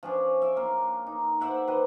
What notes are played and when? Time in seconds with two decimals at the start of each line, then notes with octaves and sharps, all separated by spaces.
0.03 F3 C#4 D4
0.42 E5 D6
0.56 A#3 F4
1.07 D#4
1.41 C5 D5 E5 F#5
1.67 D#3 B4 C5 D#5